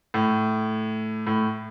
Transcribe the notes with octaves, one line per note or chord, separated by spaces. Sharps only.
A2
A2